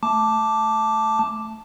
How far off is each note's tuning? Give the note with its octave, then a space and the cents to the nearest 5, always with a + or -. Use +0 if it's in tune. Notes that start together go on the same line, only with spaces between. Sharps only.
A3 -5 A5 +0 D6 +0